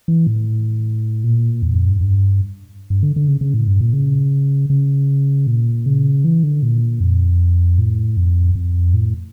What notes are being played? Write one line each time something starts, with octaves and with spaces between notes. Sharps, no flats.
E3
A2
A#2
E2
F2
G2
G2
G2
D3
D3
C#3
C#3
A2
G2
A#2
C#3
C#3
A#2
C#3
E3
D3
A#2
F2
A2
F2
F2
A2